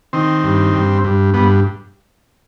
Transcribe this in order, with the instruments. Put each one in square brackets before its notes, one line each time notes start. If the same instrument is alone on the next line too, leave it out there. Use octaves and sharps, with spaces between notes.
[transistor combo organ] D#3 C4
G2
G2
G2
G2 B3